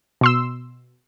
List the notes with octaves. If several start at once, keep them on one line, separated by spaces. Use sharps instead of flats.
B2 C6 E6